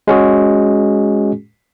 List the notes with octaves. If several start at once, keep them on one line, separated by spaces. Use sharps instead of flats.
G#3 C#4 F#4 G#4